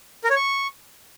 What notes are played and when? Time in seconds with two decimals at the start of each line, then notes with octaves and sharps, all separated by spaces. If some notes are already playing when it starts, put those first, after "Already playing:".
0.24 A#4
0.30 C#5
0.36 C#6